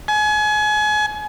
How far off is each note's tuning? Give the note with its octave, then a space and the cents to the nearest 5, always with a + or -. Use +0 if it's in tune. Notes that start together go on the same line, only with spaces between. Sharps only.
G#5 +30